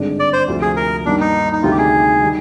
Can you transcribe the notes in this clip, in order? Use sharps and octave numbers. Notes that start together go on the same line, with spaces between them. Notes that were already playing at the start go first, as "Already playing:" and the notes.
Already playing: G#1 G2 D3 G#3 D4
D5
C5
D2 C3 F3
G#4
A#4
G2 D#3 A#3 D4
D#4
D#4
D2 C3 D#3 G3 F4
G4
G#4
D#3 G3